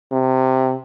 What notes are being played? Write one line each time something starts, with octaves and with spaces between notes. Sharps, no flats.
C3